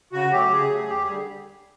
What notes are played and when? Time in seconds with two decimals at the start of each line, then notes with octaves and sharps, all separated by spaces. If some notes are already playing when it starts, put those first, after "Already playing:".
0.13 C#3 F#4
0.32 F#3 A3 G4
0.51 C#3 G#4
0.70 F#3 A3
0.89 D#2 G4
1.02 G#4
1.09 D3 G3